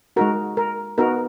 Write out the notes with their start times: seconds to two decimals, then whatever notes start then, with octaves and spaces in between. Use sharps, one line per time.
0.16 G#3 D#4 F#4 A#4
0.57 A#4
0.98 B3 D#4 F#4 A#4